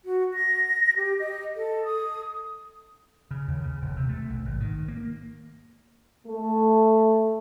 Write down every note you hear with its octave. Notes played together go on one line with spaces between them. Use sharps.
F#4
A#6
G4
D#5
A4
D#6
C#3
D#2
C#3
D#1
C3
A3
B1
G#1
D#3
A#3
A3